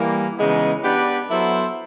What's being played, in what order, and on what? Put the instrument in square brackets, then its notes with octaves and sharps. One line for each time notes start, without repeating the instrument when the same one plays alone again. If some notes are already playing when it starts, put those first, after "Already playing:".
Already playing: [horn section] E3 G3 A#3
C#3 E3 G#3 B3 D#4
B3 D4 G4 B4 D5
F#3 B3 E4 A4 C5